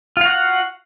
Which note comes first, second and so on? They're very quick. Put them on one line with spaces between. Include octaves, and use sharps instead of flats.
F4 F5 F#4 F#5